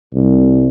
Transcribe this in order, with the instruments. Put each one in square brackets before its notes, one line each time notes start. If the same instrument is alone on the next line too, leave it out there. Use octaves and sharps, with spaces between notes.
[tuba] C2